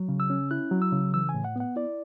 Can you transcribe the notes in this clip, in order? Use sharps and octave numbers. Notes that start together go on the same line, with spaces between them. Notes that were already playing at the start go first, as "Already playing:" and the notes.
Already playing: F#3
C#3
E6
C#4
E4 F#6
F#3
E6
C#3
E3 E6
G#5
A2
F#5
B3 F#5
E4 D5